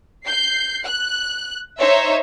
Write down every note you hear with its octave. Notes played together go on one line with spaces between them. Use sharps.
G6 C7
F#6
D#4 C5 C#5 E5